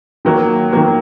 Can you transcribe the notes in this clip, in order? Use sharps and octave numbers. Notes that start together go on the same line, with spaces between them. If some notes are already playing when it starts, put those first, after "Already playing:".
D#3 F#3 A#3
D#3 F#3 A#3